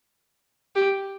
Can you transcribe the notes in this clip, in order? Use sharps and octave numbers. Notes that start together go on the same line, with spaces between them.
G4